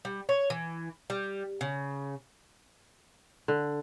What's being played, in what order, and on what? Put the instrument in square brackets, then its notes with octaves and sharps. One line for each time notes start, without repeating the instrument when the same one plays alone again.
[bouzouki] G3
C#5
E3
G3
C#3
[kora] D3